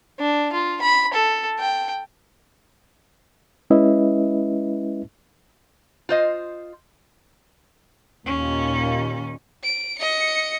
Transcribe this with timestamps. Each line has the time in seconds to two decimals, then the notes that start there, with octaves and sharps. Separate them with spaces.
0.20 D4
0.53 F4
0.82 B5
1.14 A4
1.59 G5
3.70 G#3 C#4 E4 B4 D#5 E5
6.09 F4 C5 D#5
8.26 D#2 A#2 C#4
9.64 D7
9.98 D#5 C#7